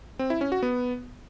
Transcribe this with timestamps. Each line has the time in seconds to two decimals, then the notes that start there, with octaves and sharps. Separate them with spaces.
0.19 C4
0.30 E4
0.41 C#4
0.52 F#4
0.63 B3